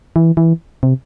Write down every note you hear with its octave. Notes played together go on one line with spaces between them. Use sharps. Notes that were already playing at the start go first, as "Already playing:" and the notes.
E3
E3
C3